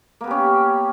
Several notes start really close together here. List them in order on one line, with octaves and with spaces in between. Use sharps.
A#3 B3 G4 C#4